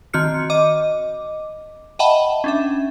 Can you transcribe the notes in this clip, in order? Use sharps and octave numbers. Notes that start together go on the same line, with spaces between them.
D#3 C4 F#4 F6 C#7
D#5 D6
D#5 E5 F#5 G5 A5 B5
C#4 D4 E5